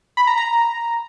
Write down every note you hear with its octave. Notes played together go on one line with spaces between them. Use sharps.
B5
A#5
A#5